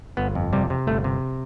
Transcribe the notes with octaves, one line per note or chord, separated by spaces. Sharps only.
G1 B3
F2
C3 G3
C3
G1 A3
C3